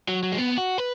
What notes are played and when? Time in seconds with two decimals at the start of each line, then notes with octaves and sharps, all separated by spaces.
0.08 F#3
0.23 F#3
0.32 G#3
0.38 B3
0.58 F#4
0.78 B4